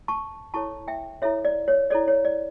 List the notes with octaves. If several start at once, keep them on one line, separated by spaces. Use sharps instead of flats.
A5 C#6
E4 A4 C#5 A5 C#6
E5 G5
E4 A4 C#5 E5
D5
C#5
E4 A4 C#5 D5
C#5
D5